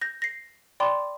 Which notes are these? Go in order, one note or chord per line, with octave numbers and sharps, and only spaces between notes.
G6 A#6
A#6 C7
D5 G5 B5 C6 D6